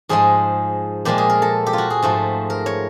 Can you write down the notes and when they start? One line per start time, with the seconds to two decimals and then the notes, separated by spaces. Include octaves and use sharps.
0.09 G#2 F3 G#3 G#4
1.05 A#2 F3 G#3 G4
1.18 G#4
1.29 A#4
1.42 A4
1.66 G4
1.73 F4
1.78 F#4
1.90 G#4
2.02 G#2 F3 A3
2.50 A#4
2.66 C#5